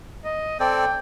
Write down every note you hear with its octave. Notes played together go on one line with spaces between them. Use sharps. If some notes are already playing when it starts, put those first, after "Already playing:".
D#5
C4 A4 D5 G5